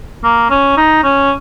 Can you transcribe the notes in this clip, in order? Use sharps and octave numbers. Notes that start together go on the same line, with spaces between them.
A#3
C#4
D#4
C#4